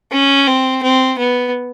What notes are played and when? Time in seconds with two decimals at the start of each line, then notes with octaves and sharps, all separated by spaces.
0.12 C#4
0.47 C4
0.83 C4
1.18 B3